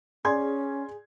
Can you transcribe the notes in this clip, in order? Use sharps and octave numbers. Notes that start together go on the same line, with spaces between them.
C#4 G#4 D5 C6 G#6